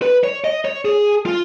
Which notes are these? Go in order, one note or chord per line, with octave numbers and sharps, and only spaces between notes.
B4
C#5
D#5
C#5
G#4
F4